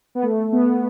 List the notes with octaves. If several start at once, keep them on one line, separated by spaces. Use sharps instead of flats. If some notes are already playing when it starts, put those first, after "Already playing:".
B3
A3
B3